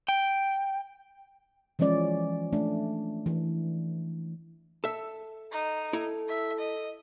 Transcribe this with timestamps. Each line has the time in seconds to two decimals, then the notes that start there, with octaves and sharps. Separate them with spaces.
0.09 G5
1.79 E3 F3 G#3 C#4 D5
2.53 A3 D4
3.26 E3
4.84 A4 E5
5.52 D#4
5.93 E4 A4 A#5
6.28 E5
6.58 D#5